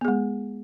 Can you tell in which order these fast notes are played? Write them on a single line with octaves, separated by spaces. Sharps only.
B3 G#4 G#3